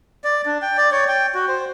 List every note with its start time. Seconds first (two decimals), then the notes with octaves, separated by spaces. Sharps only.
0.24 D5
0.46 D4
0.62 G5
0.77 D5
0.92 C#5
1.08 G5
1.35 F#4
1.48 C5